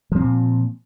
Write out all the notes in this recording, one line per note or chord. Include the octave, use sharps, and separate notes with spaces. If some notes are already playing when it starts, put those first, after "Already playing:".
A#2 F3 C4